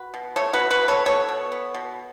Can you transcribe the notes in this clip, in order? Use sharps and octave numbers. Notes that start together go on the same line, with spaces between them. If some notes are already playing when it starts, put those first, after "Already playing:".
Already playing: F#4 B4
B2
A3 A4 C#5
F#4 B4
F#3
F#4 B4
B2
A4 C#5
B3 A4 C#5
B2
B3
B2